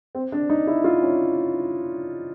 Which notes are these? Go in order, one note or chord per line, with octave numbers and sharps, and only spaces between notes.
C4
D4
D#4
E4
F4
C#4